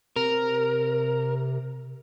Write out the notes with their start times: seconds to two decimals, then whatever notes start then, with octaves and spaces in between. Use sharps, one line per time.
0.16 C3 A#4